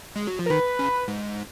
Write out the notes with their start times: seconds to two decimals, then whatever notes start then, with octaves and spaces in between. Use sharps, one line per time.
0.16 G#3
0.27 F#3
0.39 F3
0.46 A#4
0.50 D#3 B4
0.79 C#3
1.08 G#2